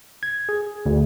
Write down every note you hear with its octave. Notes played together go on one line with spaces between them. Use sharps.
G#6
G#4
D2